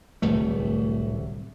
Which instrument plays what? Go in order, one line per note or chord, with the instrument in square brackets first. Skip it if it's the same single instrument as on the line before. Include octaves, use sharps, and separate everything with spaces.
[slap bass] D1 C2 A3